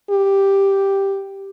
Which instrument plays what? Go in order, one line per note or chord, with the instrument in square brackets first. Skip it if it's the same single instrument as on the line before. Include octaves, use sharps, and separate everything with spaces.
[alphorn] G4